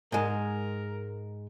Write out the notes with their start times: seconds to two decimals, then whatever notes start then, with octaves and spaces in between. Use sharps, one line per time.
0.12 G#2 G#3 A#4